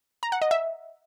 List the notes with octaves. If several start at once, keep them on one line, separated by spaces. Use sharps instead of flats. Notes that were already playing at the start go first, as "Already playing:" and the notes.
A#5
F#5
D#5
E5